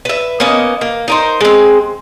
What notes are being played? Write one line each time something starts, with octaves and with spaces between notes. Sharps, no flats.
B4 E5
A#3 B3 C#4 D#5
A#3
D#4 A#4 C5
G#3 C4